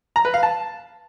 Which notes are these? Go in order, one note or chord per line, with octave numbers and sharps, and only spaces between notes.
A#5
B4
F5
A5